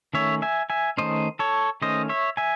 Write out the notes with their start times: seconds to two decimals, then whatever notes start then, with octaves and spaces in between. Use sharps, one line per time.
0.14 D#3 A3 C#4 C#5 E5
0.42 E5 G#5
0.70 E5 G#5
0.97 D#3 A3 C#4 C5 D#5
1.39 A4 C#5
1.82 D#3 A3 C#4 C5 D#5
2.09 C#5 E5
2.37 E5 G#5